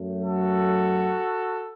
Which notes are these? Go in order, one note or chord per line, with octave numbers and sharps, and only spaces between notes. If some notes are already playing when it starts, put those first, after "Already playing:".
Already playing: F#2 F#3 A3
F#4 A4